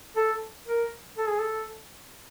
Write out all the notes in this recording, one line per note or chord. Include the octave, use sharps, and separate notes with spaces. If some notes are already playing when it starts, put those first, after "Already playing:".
A4
A#4
A4
G#4
A4